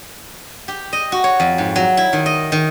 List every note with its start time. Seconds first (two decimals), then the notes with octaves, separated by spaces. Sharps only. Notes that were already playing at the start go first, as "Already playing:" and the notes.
0.68 G4
0.93 D#5
1.12 F#4
1.24 C#5
1.40 F2
1.58 G#2
1.76 F#3
1.97 E4
2.13 D#3
2.26 D#5
2.52 D#3